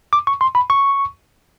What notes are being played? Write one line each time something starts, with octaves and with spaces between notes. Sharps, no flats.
D6
C#6
C6
B5
C#6